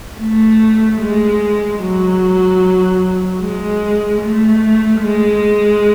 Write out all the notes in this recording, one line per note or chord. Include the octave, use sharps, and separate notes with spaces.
A3
G#3
F#3
G#3
A3
G#3